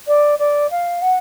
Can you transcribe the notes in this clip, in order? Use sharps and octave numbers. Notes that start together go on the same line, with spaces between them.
D5
D5
F5
F#5